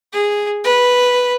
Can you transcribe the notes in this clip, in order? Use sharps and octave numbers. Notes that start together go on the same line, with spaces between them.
G#4
B4